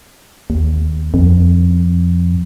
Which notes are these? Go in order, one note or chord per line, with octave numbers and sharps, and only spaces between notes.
D#2
F2